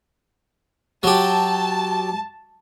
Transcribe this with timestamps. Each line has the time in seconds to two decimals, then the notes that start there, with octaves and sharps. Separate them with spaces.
1.03 F#3 G4 A5